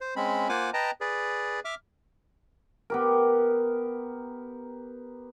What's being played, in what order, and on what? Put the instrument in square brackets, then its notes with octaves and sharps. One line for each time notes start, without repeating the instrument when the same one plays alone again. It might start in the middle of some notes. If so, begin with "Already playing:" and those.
[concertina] C5
G#3 C4 C#4 B5
A#3 F4 C5 F#5 G#5 D6
B4 D#5 G5 A5 A#5
G#4 B4 D5
E5 D6 F6
[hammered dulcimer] B3 G4 A#4